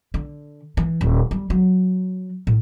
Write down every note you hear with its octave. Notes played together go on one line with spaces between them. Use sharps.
D3
E3
D#1
G3
F#3
A2